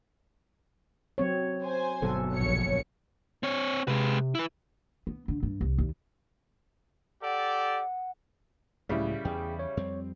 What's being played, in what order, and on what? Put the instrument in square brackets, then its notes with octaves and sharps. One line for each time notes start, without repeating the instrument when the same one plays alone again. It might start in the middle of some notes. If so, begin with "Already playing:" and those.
[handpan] F#3 C4 C#5
[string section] C5 G#5
[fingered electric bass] G1 B2 F#3 [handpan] A4
[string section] A#1 C#5 C#7
[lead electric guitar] C4 C#5
[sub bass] C3 [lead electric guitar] G#3 B4
[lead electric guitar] E4 B4
[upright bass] B3
D3
G2
C2
D#2
[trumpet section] G4 A4 D5 [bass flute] F#5
[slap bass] C#2 F#3 [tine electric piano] A2 [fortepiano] C#3 G3 E4
[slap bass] E2 [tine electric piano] G#4 G5
[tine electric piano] C#5
[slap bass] F2 G3 C4